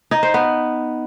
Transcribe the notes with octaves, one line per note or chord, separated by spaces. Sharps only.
D#4
C5
B3